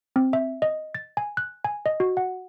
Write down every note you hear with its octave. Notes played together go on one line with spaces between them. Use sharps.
C4
E5
D#5
A6
G#5
F#6
G#5
D#5
F#4
F#5